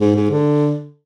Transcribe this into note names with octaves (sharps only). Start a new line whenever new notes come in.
G#2
G#2
D3